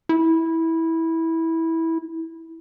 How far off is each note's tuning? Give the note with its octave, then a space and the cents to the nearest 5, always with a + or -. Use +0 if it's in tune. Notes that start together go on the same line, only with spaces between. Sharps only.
E4 -15